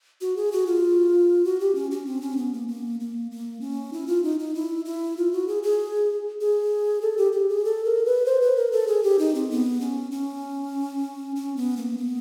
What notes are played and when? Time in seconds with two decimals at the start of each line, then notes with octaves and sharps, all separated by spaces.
0.21 F#4
0.36 G#4
0.52 F#4
0.67 F4
1.45 F#4
1.60 G4
1.75 C#4
1.91 C#4
2.06 C4
2.22 C#4
2.37 B3
2.53 A#3
2.68 A#3
3.00 A#3
3.31 A#3
3.61 C#4
3.93 E4
4.07 F4
4.24 D#4
4.40 D#4
4.55 E4
4.85 E4
5.17 F4
5.33 F#4
5.48 G#4
5.63 G#4
6.41 G#4
7.02 A4
7.18 G4
7.33 G4
7.49 G#4
7.65 A4
7.85 A#4
8.05 B4
8.26 C5
8.42 B4
8.57 A#4
8.72 A4
8.88 G#4
9.03 G4
9.19 D#4
9.35 C4
9.51 B3
9.81 C#4
10.11 C#4
11.36 C#4
11.57 B3
11.77 A#3
11.98 B3